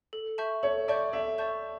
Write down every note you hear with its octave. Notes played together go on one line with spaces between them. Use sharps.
A4
E5 A5 C#6 G6
A4 C#5
D5 E5 A5 C#6 G6
A4 E5
D5 A5 C#6 G6